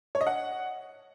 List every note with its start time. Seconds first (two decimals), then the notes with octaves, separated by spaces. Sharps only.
0.15 C#5
0.21 D#5
0.27 F#5